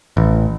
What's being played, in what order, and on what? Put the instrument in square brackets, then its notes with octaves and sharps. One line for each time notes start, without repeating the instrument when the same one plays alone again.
[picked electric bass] A1